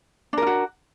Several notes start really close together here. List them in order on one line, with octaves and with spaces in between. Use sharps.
D4 A#4 F4 F#4